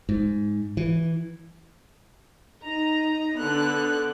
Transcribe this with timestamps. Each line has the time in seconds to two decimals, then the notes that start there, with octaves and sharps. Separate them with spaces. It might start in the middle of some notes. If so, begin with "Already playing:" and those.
0.09 G#2
0.77 E3
2.64 D#4 A#5
3.38 D3 B3 F#6